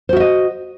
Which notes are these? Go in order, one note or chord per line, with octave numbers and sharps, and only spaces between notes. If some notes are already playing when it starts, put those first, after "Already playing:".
F#4 C5 D#5 E5